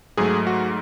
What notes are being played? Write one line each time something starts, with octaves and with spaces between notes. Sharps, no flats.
G#2 F#3 A3 G#4
F#4